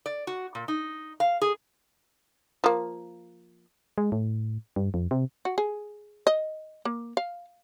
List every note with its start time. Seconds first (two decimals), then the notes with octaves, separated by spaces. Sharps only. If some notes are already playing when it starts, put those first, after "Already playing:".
0.06 D5
0.27 F#4
0.55 A#2
0.68 D#4
1.20 F5
1.42 G#4
2.64 F3 A#3
3.98 G#3
4.12 A2
4.76 G2
4.94 F2
5.11 C3
5.45 F#4
5.58 G#4
6.27 D#5
6.85 A#3
7.17 F5